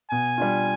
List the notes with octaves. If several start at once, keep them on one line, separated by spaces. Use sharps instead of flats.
B2 G#5
G3 D4 F4